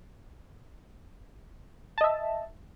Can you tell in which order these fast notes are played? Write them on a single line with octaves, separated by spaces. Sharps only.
A5 D#5 E5